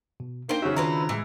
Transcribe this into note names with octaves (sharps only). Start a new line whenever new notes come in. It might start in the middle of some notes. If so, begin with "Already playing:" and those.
B2
A#3 D4 D#4 C5 G5
C#3 C#4 D#4 F#4 E5
D#3 D4 E4 F4 B4 C5 A#5
A2 E3 G#3